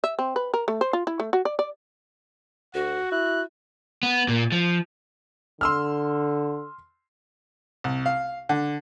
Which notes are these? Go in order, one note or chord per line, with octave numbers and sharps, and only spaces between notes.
E5
C4
B4
A#4
A3
C5
F4
E4
A3
F#4
D5
D5
D2 F#4 F#5
E4 F#6
B3
A#2
F3
D3 C6 E6 F6
C2
F5
D3